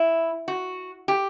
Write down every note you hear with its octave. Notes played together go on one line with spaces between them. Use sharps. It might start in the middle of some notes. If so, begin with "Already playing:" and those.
Already playing: E4
F#4
G4